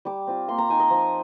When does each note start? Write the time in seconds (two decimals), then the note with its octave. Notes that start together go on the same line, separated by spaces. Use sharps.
0.05 G3 D6
0.27 C4 F4
0.48 A#3 C6
0.58 A#5
0.70 D#4 G#5
0.80 D#5
0.90 F3